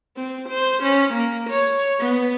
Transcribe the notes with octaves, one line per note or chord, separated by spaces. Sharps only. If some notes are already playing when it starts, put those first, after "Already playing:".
C4
C5
C#4
A#3
C#5
B3